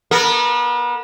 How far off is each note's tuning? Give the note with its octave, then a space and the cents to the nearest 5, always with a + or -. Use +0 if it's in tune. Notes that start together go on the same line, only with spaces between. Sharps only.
B3 -35 A#4 -25